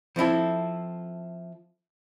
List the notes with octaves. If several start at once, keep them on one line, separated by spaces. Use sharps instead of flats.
F3 C4 E4 A4